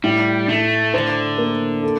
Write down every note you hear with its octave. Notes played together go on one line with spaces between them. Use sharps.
A2 G3
A2 A3
D3 C5
A#3
A4